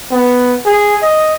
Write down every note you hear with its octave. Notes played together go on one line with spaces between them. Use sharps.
B3
G#4
D#5